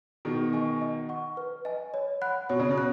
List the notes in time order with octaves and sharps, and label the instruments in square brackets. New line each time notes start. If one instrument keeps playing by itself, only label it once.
[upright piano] B2 D#3 [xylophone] G#4
[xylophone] D#5 G#5 C#6
D#5
F#5 C#6
B4
D#5 G#5
C#5
F#5 B5 F#6
[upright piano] B2 [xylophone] C#5
[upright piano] C#3
B2
[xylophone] F#6